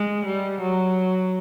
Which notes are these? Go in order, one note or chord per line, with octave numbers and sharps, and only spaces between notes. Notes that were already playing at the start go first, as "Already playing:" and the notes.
Already playing: G#3
G3
F#3